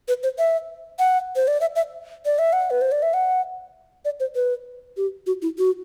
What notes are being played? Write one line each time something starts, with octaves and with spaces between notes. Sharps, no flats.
B4
C5
E5
F#5
C5
D5
E5
E5
D5
E5
F#5
B4
C5
D5
E5
F#5
D5
C5
B4
G4
F#4
E4
F#4